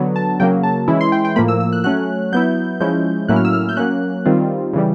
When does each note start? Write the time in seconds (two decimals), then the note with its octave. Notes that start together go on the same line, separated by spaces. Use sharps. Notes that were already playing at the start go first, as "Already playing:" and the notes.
Already playing: D3 F#3 B3
0.16 A5
0.40 C#3 F#3 A#3 G5
0.63 A5
0.88 E3 G#3 C#4 E4
1.01 C6
1.12 G5
1.25 G5
1.36 A2 F3 A#3 B5
1.48 E6
1.60 E6
1.73 F#6
1.84 F#3 A3 C#4 F#6
2.33 F#3 B3 E4 G6
2.80 F3 G#3 C#4 E4 G6
3.28 A2 F#3 A#3 C#4 E4 F#6
3.36 F6
3.45 E6
3.53 F6
3.69 G6
3.77 F#3 A#3 C#4 F#6
4.25 D#3 G3 C4 F4
4.73 C#3 E3 G3